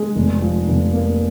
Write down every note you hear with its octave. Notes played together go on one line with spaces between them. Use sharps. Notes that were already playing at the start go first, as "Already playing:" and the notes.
Already playing: G#3
F1
F3
F1
A#3